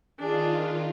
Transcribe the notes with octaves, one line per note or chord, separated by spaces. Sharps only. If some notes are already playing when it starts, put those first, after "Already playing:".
D#3 D4 F4 G#4